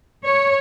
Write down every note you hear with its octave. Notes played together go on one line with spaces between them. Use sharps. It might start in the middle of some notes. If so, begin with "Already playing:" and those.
C#5